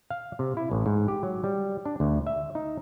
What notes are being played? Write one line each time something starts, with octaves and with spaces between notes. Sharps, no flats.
F5
C3
E4
A1
G#2
G4
F#3
G3
D4
D2
E5
D#4